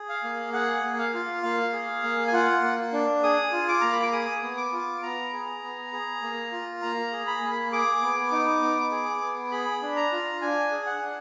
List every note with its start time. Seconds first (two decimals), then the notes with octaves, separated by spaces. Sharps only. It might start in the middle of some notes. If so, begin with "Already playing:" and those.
Already playing: G#4
0.09 F5
0.24 A#3
0.53 G#4 F#5
0.83 A#3
0.98 F5
1.14 F4
1.43 A#3 F5
1.73 G#4
2.03 A#3
2.27 G#5
2.33 F4 F#5
2.62 A#3
2.93 D4
3.24 G#4 D#6
3.52 F4
3.68 D6
3.81 A#3 A#5
3.92 B5
4.02 D6
4.12 G#4 D#6
4.42 B3
4.57 D6
4.72 F4
5.03 B3 A#5
5.33 G#4
5.63 B3
5.93 G#4
6.22 A#3
6.52 F4
6.82 A#3 A#5
7.12 G#4
7.27 B5
7.42 A#3
7.72 G#4 D6
8.02 B3
8.32 D#4
8.62 B3
8.91 G#4
9.22 B3
9.51 G#4 B5
9.82 D4
9.97 A#5
10.12 F4
10.41 D4 G#5
10.71 G#4
10.86 F#5
11.02 D4